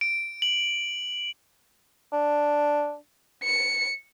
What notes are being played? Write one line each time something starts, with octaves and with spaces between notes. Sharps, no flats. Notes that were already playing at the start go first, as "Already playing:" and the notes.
D7
F#7
D4
C#7